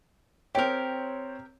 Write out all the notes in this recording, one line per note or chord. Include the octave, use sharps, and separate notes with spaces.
C4 G4 A#4 C#5